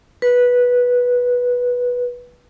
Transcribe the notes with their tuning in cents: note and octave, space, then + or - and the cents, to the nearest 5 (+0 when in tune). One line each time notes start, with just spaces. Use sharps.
B4 -10